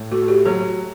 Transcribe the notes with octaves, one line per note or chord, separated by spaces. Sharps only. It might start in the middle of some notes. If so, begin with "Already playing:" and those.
Already playing: A2
A3 F#4
G4
F#3 A4